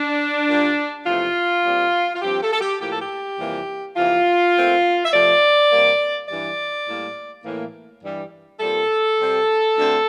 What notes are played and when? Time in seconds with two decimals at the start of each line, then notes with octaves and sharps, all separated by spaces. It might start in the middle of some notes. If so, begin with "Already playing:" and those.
Already playing: D4
0.49 A#2 G3 A#3
1.06 E2 C3 F3 A3 F4
1.64 A#2 G3 C4
2.15 F4
2.22 G2 F3 C4 G4
2.42 A4
2.53 A4
2.61 G4
2.80 A2 F3 A#3 G4
2.91 A4
3.01 G4
3.39 F2 C3 E3 G3 A#3
3.96 F2 C3 E3 A#3 F4
4.54 A#2 A3 C4
5.05 E5
5.13 C3 F3 A3 D5
5.71 C3 G3 A#3
6.28 G2 E3 G3 D5
6.87 A2 G3 A#3
7.45 A2 E3 A#3
8.03 G2 E3 G3
8.60 A#2 G3 C4 A4
9.19 C3 G3 C4
9.77 D2 D3 A3 C4